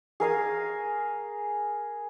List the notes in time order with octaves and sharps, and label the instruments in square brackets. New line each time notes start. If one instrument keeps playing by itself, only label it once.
[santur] G#4 A#4 F5 G#5